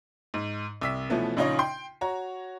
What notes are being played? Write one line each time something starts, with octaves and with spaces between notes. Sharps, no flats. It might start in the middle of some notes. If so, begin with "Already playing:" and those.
G#2
C2 E6 B6
B2 E3 F3 A3 B3 C#4
A#1 C#3 D#4 F4 C#5 D#5
G5 C6
F#4 C#5 A#5